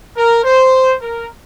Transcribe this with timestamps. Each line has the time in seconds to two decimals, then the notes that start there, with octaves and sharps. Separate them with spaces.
0.16 A#4
0.44 C5
1.02 A#4